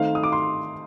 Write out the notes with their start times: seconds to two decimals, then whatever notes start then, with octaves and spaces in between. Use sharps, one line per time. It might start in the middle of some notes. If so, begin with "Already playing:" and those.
Already playing: D#3 A3 C4 F5
0.15 D#6
0.23 D6
0.32 C6